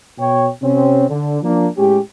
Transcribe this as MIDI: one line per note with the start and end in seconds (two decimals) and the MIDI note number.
0.19 0.49 47
0.19 0.49 73
0.19 0.49 79
0.62 1.05 48
0.62 1.05 60
0.62 1.05 61
1.10 1.40 50
1.43 1.68 53
1.43 1.68 58
1.43 1.68 62
1.77 1.98 45
1.77 1.98 56
1.77 1.98 61
1.77 1.98 67